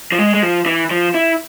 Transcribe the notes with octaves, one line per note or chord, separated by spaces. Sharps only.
F3
G#3
G#3
F3
E3
F3
E4